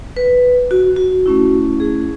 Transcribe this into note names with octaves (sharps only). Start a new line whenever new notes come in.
B4
F#4
F#4
A3 C#4 E4
G#4